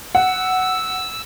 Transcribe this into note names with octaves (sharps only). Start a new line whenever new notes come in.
F#5 E6